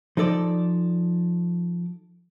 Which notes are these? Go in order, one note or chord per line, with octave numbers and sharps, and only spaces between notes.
F3 D#4 A4 D5